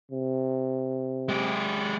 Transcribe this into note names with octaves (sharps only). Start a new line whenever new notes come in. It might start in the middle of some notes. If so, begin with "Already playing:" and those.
C3
G#3 G4